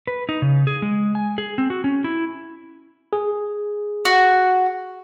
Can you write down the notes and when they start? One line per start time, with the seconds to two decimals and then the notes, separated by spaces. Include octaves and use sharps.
0.07 B4
0.29 D#4
0.42 C#3
0.67 G#4
0.82 G#3
1.15 G#5
1.38 G#4
1.58 C4
1.70 F#4
1.84 C#4
2.04 E4
3.13 G#4
4.05 F#4